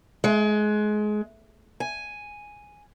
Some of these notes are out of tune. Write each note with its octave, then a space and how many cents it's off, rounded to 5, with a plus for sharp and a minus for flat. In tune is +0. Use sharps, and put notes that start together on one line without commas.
G#3 +25
G#5 +0